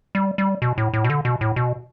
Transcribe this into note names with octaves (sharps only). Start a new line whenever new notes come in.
G3
G3
B2
A2
A2
B2
D3
B2
A2
B2